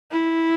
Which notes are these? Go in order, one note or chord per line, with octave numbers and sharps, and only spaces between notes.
E4